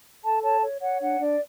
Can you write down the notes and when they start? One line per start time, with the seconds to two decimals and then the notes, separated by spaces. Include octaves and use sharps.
0.23 A4 A5
0.42 C#5 A5
0.62 C#5
0.81 C#5 F#5
1.00 D4 F#5
1.20 D4 D5